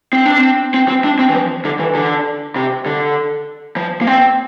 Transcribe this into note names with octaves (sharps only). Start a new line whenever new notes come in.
C4
D4
C4
C4
C4
D4
C4
E3
F3
D3
E3
D3
C3
D3
F3
A#3
C4